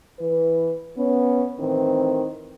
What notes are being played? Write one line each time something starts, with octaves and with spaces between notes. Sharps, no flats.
E3 B4
B3 C#4
A2 D#3 E3 C4